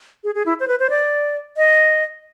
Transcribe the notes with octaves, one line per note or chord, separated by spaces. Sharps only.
G#4
G#4
E4
C5
B4
C5
D5
D#5